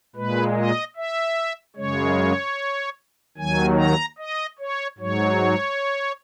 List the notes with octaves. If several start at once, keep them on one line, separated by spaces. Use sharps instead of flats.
A#2 G#3 B4
D#5
E5
F#2 C#3 G#3 C#5
D#2 D#3 F#3 G#5
A#5
D#5
C#5
G#2 F#3 C#5